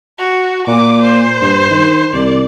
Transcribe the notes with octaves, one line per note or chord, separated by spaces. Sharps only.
F#4
A#2 D6
C5
G2
D#3
C2 D5